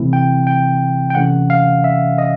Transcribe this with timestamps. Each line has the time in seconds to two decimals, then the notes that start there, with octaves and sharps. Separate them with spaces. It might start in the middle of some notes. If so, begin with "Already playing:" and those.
Already playing: C3 E3 A3 C4 E4
0.13 G5
0.47 G5
1.10 G5
1.15 C3 E3 A3 C#4 F#5
1.50 F5
1.84 E5
2.18 D#5